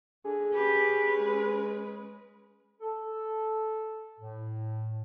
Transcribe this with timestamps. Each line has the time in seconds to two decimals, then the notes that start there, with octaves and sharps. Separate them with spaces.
0.25 D3 G#4
0.54 C#4 G4 B4
1.17 G#3
2.80 A4
4.19 A2